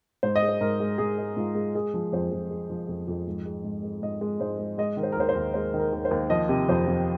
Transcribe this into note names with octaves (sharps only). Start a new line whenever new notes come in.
G#2 C5
D#5
G#3
C5
G#2 A#4
G#3
G#2 G#4
G#3
G#2 F4
G#3
G#3 G#4
F3
F2 C5
F2
G#3
F3
F2
F2
G#2
G#3
G#2
G#3
G#2 D#5
G#3
G#2 C5
G#3
G#3 D#5
D#3
C5
A#4
D#2 C5
C5
D#2
G#3 C5
D#3
A#4
D#2
C5
D#2
F3 D#5
C3
F2 C5
F2